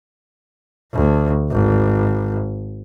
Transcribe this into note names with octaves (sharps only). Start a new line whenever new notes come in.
D2
G#1